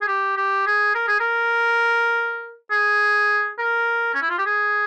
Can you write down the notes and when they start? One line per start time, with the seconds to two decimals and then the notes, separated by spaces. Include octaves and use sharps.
0.02 G#4
0.08 G4
0.37 G4
0.67 G#4
0.95 A#4
1.08 G#4
1.20 A#4
2.71 G#4
3.59 A#4
4.14 C#4
4.22 E4
4.30 F4
4.38 G4
4.46 G#4